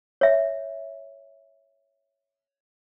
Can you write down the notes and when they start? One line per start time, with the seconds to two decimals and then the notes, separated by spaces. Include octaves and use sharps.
0.21 C#5 E5